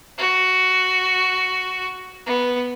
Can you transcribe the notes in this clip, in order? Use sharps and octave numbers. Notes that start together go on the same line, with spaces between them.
F#4
B3